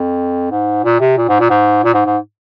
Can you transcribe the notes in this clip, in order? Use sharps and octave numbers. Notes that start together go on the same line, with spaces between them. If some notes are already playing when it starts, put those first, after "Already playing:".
Already playing: F2
G#2
A#2
C3
A#2
G#2
A#2
G#2
A#2
G#2
G#2